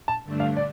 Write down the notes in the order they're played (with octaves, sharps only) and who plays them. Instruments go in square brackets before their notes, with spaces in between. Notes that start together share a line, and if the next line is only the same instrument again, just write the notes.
[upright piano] A5
[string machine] G2 D3 A3 D4
[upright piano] F5
D5